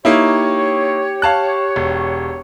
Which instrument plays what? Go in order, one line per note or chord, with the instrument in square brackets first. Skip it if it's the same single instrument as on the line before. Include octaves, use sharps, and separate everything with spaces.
[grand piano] A#3 D#4 E4 [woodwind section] G4 C#5
[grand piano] F5 A5 F#6
E1